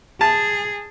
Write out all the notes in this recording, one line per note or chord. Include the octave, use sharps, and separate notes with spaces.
G#4 A5